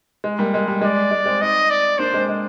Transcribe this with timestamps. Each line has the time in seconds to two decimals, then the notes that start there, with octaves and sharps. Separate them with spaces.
0.24 G#3
0.39 G3 A#3
0.54 G#3
0.68 G3
0.81 G#3 D5
1.11 G#3
1.26 G#3 C4
1.41 C4 D#4 D#5
1.70 D5
1.99 A#3 D4 C5
2.13 G#3 C4
2.29 G#3